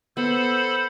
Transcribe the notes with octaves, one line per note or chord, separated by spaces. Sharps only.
B3 A4 C5 B5